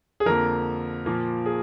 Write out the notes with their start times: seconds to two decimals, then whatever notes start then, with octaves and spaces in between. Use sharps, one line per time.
0.20 G#4
0.26 F2 D3 F3 A#3 A#4
1.06 A#2 F3 A#3
1.46 G#4